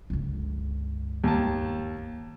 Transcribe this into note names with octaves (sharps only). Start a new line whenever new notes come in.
G1 C#2
D#2 A5